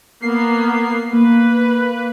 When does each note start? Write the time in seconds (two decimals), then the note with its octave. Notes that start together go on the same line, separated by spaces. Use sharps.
0.22 A#3 B3 C7
1.13 A#3 B4